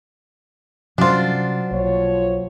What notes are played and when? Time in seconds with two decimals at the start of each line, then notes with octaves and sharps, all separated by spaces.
0.98 C3 F#3 G3 C#4 D4 F4 C5
1.71 B1 F3 A#3 C#5